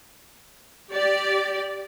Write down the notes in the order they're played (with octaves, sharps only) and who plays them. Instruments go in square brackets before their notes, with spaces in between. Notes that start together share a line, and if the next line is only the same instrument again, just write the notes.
[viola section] G4 D5